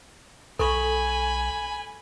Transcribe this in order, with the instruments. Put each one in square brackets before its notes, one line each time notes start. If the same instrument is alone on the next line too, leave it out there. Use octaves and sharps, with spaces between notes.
[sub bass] B1 [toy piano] A4 C#6 [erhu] G#5 [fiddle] B5